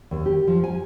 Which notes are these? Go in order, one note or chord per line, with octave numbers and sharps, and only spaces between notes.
D#2
G4
F3
G#5